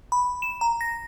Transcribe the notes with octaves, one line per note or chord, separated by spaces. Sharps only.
B5
E7
A#5
A#6